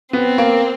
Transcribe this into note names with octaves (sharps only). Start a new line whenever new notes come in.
B3 C4
A#3